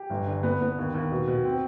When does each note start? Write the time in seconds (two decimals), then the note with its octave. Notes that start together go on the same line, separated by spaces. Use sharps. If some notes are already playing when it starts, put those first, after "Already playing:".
Already playing: G4
0.10 G1
0.26 D3
0.43 B3
0.61 B3
0.78 D#2
0.94 D#2
1.11 B2
1.27 B2
1.44 C4